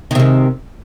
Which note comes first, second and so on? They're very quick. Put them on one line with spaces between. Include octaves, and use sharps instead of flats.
D#3 C3 G#3